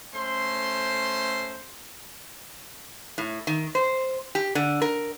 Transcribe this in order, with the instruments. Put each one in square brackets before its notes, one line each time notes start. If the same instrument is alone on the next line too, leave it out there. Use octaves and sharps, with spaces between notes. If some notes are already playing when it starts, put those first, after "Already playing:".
[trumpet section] A3 C#4 C5 C6
[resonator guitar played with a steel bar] A2
D#3
C5
G4
D3
A#4